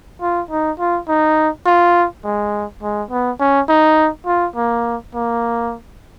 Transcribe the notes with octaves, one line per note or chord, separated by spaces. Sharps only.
F4
D#4
F4
D#4
F4
G#3
G#3
B3
C#4
D#4
F4
A#3
A#3